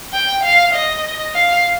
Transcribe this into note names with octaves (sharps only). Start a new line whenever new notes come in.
G5
F5
D#5
F5